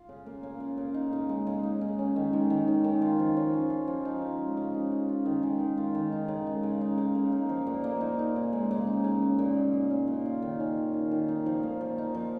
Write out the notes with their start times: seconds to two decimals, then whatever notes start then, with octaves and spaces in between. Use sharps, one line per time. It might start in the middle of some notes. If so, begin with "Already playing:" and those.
Already playing: F4
0.09 C#3
0.26 A#3
0.43 C#3
0.60 F4
0.78 C#3
0.94 D#4
1.13 C#3
1.29 G#3
1.47 C#3
1.63 D#4
1.81 C#3
1.99 C#4
2.16 D#3
2.33 G#3
2.50 D#3
2.68 C#4
2.84 D#3
3.02 F4
3.19 F3
3.37 C#4
3.53 F3
3.70 F4
3.87 F3
4.05 D#4
4.22 C#3
4.39 G#3
4.57 C#3
4.74 D#4
4.92 C#3
5.09 F4
5.26 D#3
5.43 G#3
5.59 D#3
5.78 F4
5.95 D#3
6.12 D#4
6.28 C#3
6.47 G#3
6.63 C#3
6.81 D#4
6.98 C#3
7.15 A#3
7.32 D#4
7.49 F3
7.67 A#2
7.84 A#3
8.01 D#4
8.19 D#4
8.36 C#3
8.53 G#3
8.71 C#3
8.87 D#4
9.04 C#3
9.22 C#4
9.39 A#2
9.57 G#3
9.73 A#2
9.91 C#4
10.07 A#2
10.25 F4
10.42 D#3
10.60 C#4
10.77 D#3
10.94 F4
11.11 D#3
11.28 D#4
11.46 F3
11.63 A#3
11.81 F3
11.98 D#4
12.14 F3